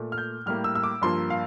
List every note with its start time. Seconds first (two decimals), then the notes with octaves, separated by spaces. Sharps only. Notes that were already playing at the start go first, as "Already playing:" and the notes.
Already playing: A#2 A3
0.12 F6
0.18 G6
0.46 A2 G3 A#3 F6
0.64 E6
0.75 E6
0.83 D6
1.02 G2 F3 A#3 C6
1.30 F5